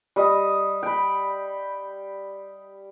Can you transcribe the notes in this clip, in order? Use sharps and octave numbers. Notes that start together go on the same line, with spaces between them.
G3 D#5
G5 B5